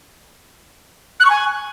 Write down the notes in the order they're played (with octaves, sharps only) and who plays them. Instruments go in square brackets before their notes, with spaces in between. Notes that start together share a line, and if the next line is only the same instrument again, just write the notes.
[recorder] F#6
C#6
G#5